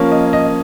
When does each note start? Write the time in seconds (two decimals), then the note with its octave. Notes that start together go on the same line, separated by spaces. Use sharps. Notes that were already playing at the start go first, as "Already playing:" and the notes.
Already playing: F3 A#3 C#4
0.11 D#5
0.33 D#5